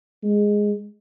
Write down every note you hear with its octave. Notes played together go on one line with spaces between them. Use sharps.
G#3